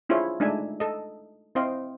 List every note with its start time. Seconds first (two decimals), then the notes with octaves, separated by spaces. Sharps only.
0.09 D4 E4 F4 G#4 C5 C#5
0.40 G#3 A3 D4 D#4 E5 G#5
0.80 A4 D#5
1.55 C4 E4 C5 D#5 F5 G5